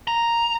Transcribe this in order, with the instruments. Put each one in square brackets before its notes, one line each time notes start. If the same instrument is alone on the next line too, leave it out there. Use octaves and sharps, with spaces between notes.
[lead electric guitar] A#5